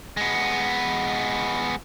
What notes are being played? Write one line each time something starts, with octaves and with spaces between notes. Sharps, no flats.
G#3 B3